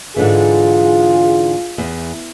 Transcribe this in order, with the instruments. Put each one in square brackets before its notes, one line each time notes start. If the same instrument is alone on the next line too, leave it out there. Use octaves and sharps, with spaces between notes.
[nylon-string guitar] G#2 D3 E3 [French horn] F4 [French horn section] G#4
[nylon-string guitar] E2